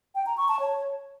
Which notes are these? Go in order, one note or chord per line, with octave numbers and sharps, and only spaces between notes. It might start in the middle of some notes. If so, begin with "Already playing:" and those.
G5
A#5
C#6
A5
C#5